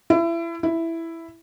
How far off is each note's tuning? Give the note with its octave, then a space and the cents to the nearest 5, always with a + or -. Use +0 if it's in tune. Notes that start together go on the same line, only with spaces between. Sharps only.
E4 +30
E4 +5